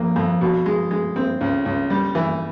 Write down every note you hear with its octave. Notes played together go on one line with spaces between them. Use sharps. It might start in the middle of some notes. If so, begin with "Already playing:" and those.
Already playing: F2 A#3
F2
B2
G#3
G#3
C4
C#2
C#2
G3
E3